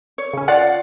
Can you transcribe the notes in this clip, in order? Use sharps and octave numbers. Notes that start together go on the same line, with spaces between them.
C#5
C#3 C#4
F4 D5 F5 F#5